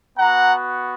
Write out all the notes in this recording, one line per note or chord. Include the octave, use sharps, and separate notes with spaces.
B3 F#4 F#5 A#5